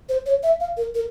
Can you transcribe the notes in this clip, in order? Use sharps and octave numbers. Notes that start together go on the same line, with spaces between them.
C5
C#5
E5
F5
A#4
A#4